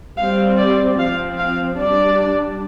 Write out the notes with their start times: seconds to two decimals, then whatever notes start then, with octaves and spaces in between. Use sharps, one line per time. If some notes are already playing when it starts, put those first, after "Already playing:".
0.18 G3 C4 F5
0.58 D5
0.98 F3 C4 F5
1.38 F5
1.78 G3 D4 D5